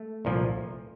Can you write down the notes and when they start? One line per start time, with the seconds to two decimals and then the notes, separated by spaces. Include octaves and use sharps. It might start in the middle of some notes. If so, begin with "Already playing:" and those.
Already playing: A3
0.25 C2 A#2 F3